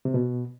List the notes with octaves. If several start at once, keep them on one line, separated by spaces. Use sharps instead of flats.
C3
B2